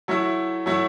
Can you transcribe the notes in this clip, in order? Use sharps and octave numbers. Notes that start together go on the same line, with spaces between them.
F#3 A3 E4
F#3 A3 E4